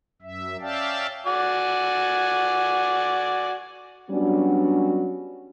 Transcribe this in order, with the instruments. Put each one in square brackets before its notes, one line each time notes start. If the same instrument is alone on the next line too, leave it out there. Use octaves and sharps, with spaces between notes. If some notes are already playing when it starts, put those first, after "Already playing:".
[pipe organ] F#2 E5
C#4 D5 E5 F5 G5 A5
[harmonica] F#4 D5 G#5
[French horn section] F#3 G3 B3 C#4 D4 F#4